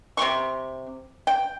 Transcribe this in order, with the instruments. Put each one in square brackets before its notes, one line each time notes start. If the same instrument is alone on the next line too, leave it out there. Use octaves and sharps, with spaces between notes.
[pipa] C3 G4 C6 C#6
G5